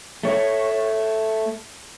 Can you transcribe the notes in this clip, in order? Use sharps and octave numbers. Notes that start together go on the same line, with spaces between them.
A3 C#5